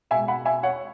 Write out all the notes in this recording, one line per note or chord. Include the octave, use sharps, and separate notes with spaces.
B2 G#3 E5 G#5
F#5 B5
E5 G#5
C#5 F#5